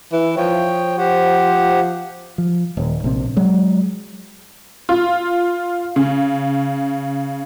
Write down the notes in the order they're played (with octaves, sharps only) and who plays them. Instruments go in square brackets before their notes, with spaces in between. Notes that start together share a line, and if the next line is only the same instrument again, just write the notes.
[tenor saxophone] E3
[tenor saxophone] F3 [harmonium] C#5 G5
[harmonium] G4 C5 F#5
[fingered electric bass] F3
D#1
A#1 C3
F#3 G#3
[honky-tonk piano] F4
C#3